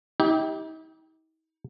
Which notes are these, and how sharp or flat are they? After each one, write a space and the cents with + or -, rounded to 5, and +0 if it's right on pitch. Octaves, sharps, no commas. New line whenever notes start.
D#4 +45 G4 +0